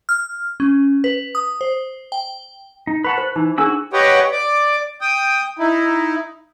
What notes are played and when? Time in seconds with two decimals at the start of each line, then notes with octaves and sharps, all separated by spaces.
0.09 F6
0.60 C#4
1.04 B4
1.35 D#6
1.61 C5
2.12 G5
2.87 D#4
3.04 B4 F#5 A5 B5 C#6
3.18 B4 C5
3.36 E3 D#4
3.58 C#4 D4 F#4 G#4 G#5 E6
3.93 G4 B4 C#5 D#5 F#5 G5
4.32 D5 D6
5.01 G5 D#6
5.59 D#4 E4